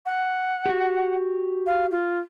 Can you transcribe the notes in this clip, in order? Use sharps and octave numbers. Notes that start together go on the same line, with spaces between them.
F#5
F#4 G4
F5
F4